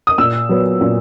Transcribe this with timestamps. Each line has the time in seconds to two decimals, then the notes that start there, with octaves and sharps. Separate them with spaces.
0.07 D#6
0.18 A#2 E6
0.49 F#3 B3
0.81 A#2